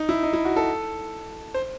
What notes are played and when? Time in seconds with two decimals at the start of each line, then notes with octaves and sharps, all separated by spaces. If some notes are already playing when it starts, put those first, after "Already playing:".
Already playing: D#4
0.09 E4
0.23 D#4
0.33 E4
0.45 F#4
0.56 A4
1.54 C5